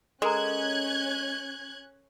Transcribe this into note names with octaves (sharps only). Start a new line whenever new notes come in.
G#3 C#4 A4 A#4 A#5 F#6 G#6